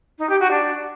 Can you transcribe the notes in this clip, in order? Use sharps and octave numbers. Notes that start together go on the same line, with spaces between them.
D#4
G4
F#4
D4